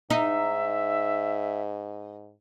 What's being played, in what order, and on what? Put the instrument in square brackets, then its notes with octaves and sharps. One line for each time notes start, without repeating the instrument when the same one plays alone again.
[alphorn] G#2 [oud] D#4 [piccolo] E5